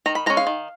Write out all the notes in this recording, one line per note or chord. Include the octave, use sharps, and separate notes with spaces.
D#3 A#5
B5
G#3 C#4 A#5
F5
D#3